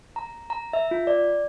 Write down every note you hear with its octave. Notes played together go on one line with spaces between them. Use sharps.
A#5
A#5
E5
F4
D5